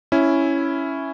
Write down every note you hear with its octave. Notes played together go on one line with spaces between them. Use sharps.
C#4 E4